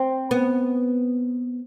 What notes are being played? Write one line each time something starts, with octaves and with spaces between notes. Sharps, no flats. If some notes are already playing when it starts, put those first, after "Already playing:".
Already playing: C4
B3